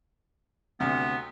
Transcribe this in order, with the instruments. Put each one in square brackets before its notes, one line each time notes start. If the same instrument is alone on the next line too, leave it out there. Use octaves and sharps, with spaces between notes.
[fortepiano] D2 C3 F6 [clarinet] B3